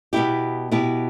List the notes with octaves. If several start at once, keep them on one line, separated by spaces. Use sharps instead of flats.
B2 B3 E4 G4
B2 B3 E4 G4